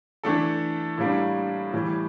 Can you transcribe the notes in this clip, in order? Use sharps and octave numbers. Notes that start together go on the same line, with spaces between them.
E3 A3 D4 A4
A2 G3 A#3 D4
A2 E3 G3